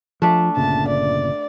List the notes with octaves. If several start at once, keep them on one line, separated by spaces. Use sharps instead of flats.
F3 A3 D4
G1 A#2 C#3 A5
D5